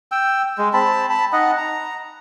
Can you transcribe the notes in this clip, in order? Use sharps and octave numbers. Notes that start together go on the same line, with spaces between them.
G5 E6
G#3
C4 A5 B5
A5 B5
D#4 D#5 F#5
A#5